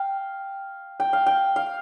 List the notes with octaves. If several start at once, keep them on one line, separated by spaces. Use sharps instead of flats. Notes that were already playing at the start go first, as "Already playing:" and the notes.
Already playing: F5 G5
G5
F5
G5
F5